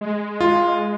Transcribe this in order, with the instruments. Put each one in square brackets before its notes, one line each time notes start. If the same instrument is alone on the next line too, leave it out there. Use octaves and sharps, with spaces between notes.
[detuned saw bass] G#3
[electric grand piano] F4